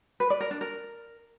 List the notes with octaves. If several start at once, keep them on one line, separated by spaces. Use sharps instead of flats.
B4
D5
A#4
D4
A#4